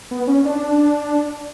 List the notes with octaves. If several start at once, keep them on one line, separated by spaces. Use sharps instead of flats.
B3
C#4
D4